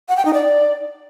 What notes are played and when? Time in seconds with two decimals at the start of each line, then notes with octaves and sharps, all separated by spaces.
0.09 F#5
0.17 G5
0.25 D#4
0.34 D5